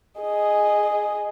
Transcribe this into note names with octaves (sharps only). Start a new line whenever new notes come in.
G#4 D#5